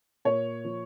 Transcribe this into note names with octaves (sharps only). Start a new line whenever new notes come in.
A#2 C#5
F3